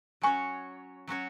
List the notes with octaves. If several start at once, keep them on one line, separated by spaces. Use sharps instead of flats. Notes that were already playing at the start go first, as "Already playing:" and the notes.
F#3 C#4 F#4 C#5 G#5 C#6
F#3 C#4 F#4 C#5